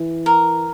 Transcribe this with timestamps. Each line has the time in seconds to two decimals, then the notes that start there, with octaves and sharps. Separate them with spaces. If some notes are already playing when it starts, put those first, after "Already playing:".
Already playing: E3
0.26 A#4